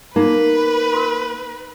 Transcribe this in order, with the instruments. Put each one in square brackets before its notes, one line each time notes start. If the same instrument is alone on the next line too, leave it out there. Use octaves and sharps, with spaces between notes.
[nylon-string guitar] A#3 [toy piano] D#4 [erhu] B4
[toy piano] A#4 C6